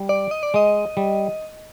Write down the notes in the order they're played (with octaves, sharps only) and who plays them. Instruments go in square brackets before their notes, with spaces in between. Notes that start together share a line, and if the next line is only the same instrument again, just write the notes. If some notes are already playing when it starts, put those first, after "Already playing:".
Already playing: [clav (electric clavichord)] G3
[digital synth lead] D5
D#5
D5
[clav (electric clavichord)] G#3 [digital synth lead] D#5
[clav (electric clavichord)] G3